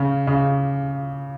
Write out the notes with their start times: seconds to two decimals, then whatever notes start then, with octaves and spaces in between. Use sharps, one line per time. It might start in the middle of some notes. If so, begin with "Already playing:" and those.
Already playing: C#3
0.27 C#3